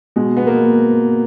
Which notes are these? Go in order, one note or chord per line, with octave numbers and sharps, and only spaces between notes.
B2 G#3
B3
G#3 A#3